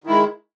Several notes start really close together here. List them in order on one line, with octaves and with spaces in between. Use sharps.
D#3 E4 G#3